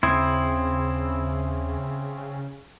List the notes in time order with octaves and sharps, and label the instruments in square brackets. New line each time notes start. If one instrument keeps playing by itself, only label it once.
[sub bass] D#2 [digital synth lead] C#3 [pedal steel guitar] C4 E4 [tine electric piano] C6 D#6 G#6